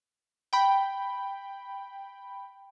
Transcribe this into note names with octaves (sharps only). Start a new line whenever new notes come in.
G5 B5